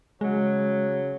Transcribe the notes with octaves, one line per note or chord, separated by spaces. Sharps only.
C#3 F#3 G#3